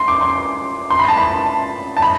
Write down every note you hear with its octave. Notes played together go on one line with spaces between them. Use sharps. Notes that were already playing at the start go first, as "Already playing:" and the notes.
Already playing: C6
D6
C6
C6
B5
A5
B5
A5
B5